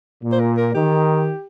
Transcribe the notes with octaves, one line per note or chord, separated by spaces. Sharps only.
A#2
C5
A#4
A#4
D#3 G4